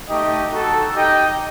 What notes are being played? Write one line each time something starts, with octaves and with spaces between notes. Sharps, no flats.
A3 D#4 G4 D#5
D#4 F#4 A4
D#4 G4 D#5 G5